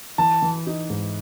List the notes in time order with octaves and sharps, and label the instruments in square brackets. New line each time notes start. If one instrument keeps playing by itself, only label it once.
[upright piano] E3 [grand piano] A5
[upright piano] E3
D#4
G#2